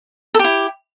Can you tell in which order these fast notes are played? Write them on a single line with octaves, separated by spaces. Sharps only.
A4 G4 E4